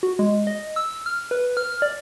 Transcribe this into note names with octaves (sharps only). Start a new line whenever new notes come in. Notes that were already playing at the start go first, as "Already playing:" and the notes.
F#4
G#3
D#5
E6
F6
B4
F6
D5